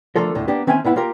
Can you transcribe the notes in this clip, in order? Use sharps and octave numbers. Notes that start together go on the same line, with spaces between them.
D3 F3 A3 F4 A4 A#4
D2 A2 D3
A#3 B3 D4 G4
D#3 C4 C#4 E5 G5 G#5
A2 B3 E4 F#5
A#3 F4 G4 A#4